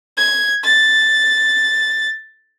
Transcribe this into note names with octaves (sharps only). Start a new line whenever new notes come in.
G#6
A6